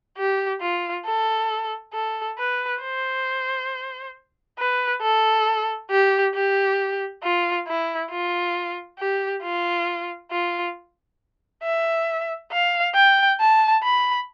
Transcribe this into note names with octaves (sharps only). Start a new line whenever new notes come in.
G4
F4
A4
A4
B4
C5
B4
A4
G4
G4
F4
E4
F4
G4
F4
F4
E5
F5
G5
A5
B5